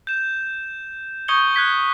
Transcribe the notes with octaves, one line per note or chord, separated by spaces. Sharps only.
G6 E7
C#6 D#6 G6 G#6 C#7 G7
F#6 G#6 B6 G7